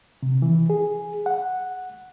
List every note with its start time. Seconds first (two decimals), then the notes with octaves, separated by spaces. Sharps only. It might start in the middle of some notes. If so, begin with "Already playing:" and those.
0.23 C3
0.42 E3
0.70 G#4
1.26 F#5